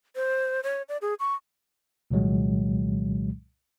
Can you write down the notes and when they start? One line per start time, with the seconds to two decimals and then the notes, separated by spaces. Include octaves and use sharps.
0.16 C5
0.63 C#5
0.89 D5
1.02 G#4
1.20 C#6
2.11 C2 A#2 D#3 F#3 G#3